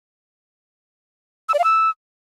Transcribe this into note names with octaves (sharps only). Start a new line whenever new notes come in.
E6
D5
F5
E6